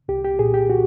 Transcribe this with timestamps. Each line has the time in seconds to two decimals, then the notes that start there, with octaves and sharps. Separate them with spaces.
0.08 C2 G4
0.25 G4
0.39 A#2 G#4
0.54 G4
0.70 F#4